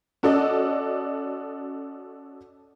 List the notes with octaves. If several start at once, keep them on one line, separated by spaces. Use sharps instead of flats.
C#4 F#4 A4 D5 D#5